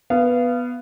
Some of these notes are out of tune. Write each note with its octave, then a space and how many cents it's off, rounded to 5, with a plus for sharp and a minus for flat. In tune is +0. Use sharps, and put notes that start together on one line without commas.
B3 +0 F5 -25